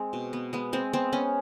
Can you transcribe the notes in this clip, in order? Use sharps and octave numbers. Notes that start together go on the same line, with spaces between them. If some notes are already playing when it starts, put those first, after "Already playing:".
Already playing: G#3 C4
B2
B3
G#3 B3
G#3 C4
B3 C4
B3 C#4